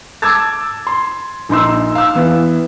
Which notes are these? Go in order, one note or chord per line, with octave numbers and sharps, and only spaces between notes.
A5 D6 E6 G#6 A6
C6
A#1 D#4 C6 E6
F5 E6
E3 B3